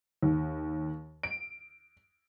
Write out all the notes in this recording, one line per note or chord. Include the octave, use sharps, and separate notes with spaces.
D#2
D7